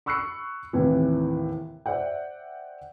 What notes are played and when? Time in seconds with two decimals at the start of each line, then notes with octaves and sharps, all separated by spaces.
0.06 B5 C#6 E6 F#6 C7 C#7
0.73 D#2 A2 C3 E3
1.86 C5 D5 E5 F#5 G5